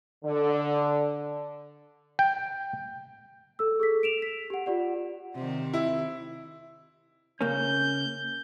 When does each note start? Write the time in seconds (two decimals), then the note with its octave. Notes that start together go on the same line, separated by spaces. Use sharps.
0.25 D3
2.19 G5
3.59 A4 E6
3.79 G#4 A4 B6
4.03 D7 E7 F7
4.22 B6
4.50 G4 F#5
4.66 F4 G4 D5 F#5
5.35 C3 D#3
5.74 E4
7.41 C#3 A#3 C#4 G6